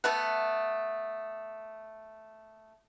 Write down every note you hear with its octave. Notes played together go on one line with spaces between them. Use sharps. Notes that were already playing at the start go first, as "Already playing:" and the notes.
A3 B3 F#5